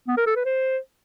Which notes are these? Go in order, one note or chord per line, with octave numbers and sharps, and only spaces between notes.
B3
A#4
A4
B4
C5